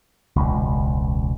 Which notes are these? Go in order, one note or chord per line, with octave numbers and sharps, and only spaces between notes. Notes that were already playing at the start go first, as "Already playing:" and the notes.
E1 C#2